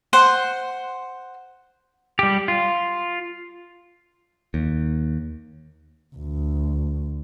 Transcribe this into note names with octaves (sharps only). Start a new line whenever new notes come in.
C5 F#5 C6
G3 G4
F4
D#2
D2